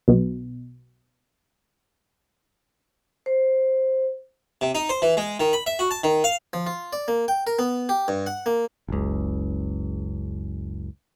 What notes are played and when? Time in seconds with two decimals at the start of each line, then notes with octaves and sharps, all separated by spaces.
0.08 B1 B2
3.26 C5
4.61 C3
4.75 D#4
4.89 C5
5.02 E3
5.17 G#3
5.40 D#3
5.53 B5
5.66 E5
5.79 F#4
5.91 A5
6.04 D#3
6.24 F5
6.53 F3
6.67 F4
6.93 D5
7.08 A#3
7.28 G5
7.47 A#4
7.59 B3
7.89 G4
8.08 G2
8.27 F#5
8.46 A#3
8.88 F#1 C#2